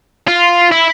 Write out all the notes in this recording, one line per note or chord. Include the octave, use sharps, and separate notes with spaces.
F4
E4